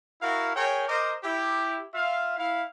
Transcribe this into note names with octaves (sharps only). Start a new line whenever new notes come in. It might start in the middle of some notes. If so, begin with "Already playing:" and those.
E4 F#4 A#4 F5
G#4 A#4 C#5 G5
A#4 C5 D#5 D6
E4 G4
F4 E5 F5
E4 F5